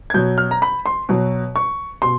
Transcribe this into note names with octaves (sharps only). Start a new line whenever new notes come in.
G#6
B2 F#3 G6
F6
A#5
B5
C6
B2 F#3
C#6
B2 C6